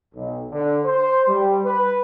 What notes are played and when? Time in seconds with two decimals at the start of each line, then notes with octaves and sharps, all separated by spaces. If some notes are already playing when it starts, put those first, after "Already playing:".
0.15 B1
0.51 D3
0.85 C5
1.28 G3
1.65 B4